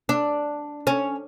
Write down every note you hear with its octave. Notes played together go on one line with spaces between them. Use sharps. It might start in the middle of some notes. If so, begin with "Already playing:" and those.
D4
C#4